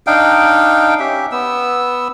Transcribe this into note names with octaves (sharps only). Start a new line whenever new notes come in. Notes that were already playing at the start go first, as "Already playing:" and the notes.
D4 D#4 F5 G5
C#4 G4 E5
B3 E6